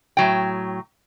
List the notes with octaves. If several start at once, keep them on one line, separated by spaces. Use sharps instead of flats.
A2 F#3 G5